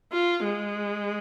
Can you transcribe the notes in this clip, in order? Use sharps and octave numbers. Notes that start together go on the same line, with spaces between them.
F4
G#3